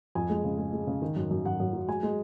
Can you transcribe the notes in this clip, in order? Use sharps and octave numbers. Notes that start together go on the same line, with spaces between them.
F2 G#5
G#3
C#3
G#3
G#3
C#3
D#3
F#2
F#2
F#2 F#5
F#2
F#3
G#3 G#5
G#3